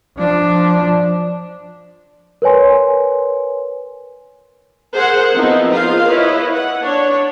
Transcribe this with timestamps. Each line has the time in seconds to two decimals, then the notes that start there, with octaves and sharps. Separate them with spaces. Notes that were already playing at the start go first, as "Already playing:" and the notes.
0.18 F3 D4
2.42 A#4 B4 C#5 G#5 C6
4.93 G#4 A#4 C5 F#5
5.34 F3 B3 C4 D#4 E4
5.73 F4 G#4 A#4 C5 D#5 F5
6.08 E4 B4 C#5 D#5
6.54 F#5
6.83 D4 C#5